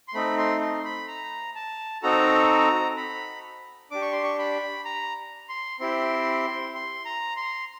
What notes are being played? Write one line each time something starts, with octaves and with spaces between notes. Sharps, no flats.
C6
A3 C4 D#4 B5
C6
C6
B5
A#5
A5
C4 D#4 F#4 A4 A#5
B5
D4 G4 D6
C#6
C6
C#6
B5
A#5
C6
C4 E4 G4 C6
C6
A#5
C6